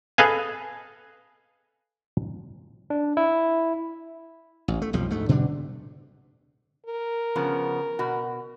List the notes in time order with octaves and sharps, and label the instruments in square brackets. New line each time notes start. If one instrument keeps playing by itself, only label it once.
[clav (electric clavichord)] G#4 A4 B4 D#5 F5 G#5
[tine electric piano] D4
E4
[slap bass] A1
A3
B1 F2 F3 G3
D2 G#2 A3
B2 D3 G3 D4
[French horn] A#4
[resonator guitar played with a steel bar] C#3 F3 B3
B2 F#4